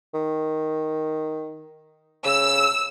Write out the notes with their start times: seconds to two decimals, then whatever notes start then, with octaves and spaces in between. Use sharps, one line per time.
0.14 D#3
2.25 C#3 E6